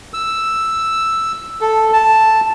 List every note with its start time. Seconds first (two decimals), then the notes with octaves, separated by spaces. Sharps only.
0.14 E6
1.61 A4
1.93 A5